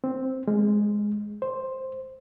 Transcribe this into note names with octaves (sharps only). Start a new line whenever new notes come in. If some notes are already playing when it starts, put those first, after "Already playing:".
C4
G#3
C5